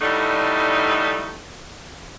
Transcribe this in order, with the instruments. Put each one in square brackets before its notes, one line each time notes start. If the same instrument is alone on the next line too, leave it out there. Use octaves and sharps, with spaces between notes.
[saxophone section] A2 D3 G3 A3 D#4